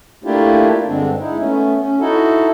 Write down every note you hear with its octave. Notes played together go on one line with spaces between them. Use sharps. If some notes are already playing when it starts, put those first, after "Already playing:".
A3 A#3 D4 E4 F4 G4
G2 D3 G#3 C4 D4
G#3 D#4 E4
A3 B3 C#4
C#4
D#4 E4 F#4 A4